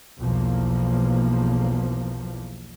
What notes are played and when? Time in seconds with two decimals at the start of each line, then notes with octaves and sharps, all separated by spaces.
0.21 B1 E2 F3 A#3